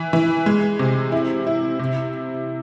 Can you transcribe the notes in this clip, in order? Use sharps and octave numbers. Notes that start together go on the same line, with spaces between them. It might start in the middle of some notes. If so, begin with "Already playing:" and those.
Already playing: E3
E3
G#3
C3
E4
E4
C3